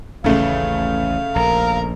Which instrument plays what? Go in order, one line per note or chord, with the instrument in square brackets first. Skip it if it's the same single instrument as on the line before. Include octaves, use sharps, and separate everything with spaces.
[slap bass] A1 D#2 [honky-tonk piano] C#3 A3 [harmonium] F5
[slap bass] A#1 [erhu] A#4